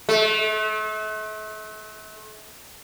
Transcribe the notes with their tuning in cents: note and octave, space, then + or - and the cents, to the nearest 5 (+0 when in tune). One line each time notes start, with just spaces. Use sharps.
A3 -40